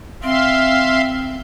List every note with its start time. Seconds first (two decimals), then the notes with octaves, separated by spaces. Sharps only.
0.23 C4 E5 F5 C6